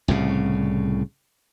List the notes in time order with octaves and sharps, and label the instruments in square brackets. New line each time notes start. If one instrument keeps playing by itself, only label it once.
[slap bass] C2 A2 C#3